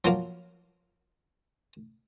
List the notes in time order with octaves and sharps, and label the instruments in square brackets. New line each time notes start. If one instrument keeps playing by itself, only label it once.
[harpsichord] F3 F#3 A#3